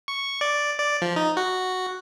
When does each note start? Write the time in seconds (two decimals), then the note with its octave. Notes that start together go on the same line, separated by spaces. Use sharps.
0.08 C#6
0.41 D5
0.79 D5
1.02 F3
1.16 D#4
1.37 F#4